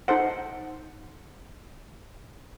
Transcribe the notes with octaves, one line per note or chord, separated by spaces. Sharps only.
D#4 A4 C5 F#5